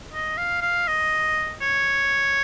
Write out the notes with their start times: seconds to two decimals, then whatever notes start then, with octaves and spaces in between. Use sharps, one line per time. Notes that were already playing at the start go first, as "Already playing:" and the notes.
0.13 D#5
0.37 F5
0.62 F5
0.87 D#5
1.61 C#5